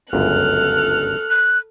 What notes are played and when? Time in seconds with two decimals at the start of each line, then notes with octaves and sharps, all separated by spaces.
0.13 G1 C#2 F#2 A4 F6 F#6
1.30 F#6